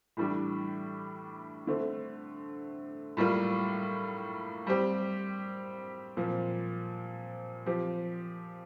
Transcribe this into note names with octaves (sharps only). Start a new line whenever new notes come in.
A2 E3 G3 D4 G4
D3 A3 C4
A2 G3 A#3 F4
G3 C4 G4
A#2 F3 C4
F3 C4 G4